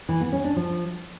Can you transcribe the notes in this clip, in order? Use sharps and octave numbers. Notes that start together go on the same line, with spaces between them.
E3
B3
C#4
D4
F3